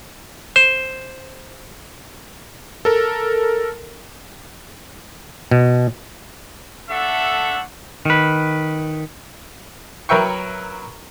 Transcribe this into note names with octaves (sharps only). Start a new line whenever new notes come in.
C5
A4 A#4
B2
A3 D4 A4 E5 F#5
D#3 B4
F#3 A#4 B4 E5 G5 C#6